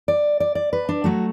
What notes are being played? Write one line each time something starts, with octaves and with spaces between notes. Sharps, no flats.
D5
D5
D5
B4
D4
F#3 A3 F#4